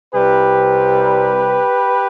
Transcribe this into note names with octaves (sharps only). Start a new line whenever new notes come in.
C2 C3 G3 G4 B4